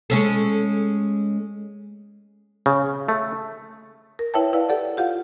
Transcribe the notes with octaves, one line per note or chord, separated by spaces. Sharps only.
G#3 C#4 A4
C#3
A3
A#4
E4 B4 C#5 E5 G5 A5
E4 B4 D5 F5
G4 A4 D5 F#5
F4 G4 F5 F#5